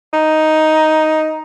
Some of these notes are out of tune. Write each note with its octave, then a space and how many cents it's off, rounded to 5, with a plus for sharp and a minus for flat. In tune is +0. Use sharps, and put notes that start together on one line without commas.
D#4 +5